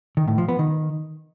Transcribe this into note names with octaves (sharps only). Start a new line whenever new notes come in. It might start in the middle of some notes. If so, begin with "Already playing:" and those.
D#3
A2
F3
B3
D#3